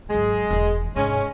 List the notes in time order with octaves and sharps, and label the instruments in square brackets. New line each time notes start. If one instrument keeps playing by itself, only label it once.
[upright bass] G#1 F#3 [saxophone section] G#3
[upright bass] E1 E3
[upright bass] G#2 C3 [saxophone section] G#3 C#4